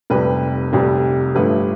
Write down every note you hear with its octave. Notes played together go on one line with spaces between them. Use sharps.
F1 F2 C3 G3 B4
F1 F2 C3 G3
G1 G2 F3 A3 B4